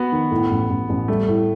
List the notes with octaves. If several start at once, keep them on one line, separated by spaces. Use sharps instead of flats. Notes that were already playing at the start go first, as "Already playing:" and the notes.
Already playing: B3 F#4
D#3
A2
A1
A1
A1
G3 A3
A2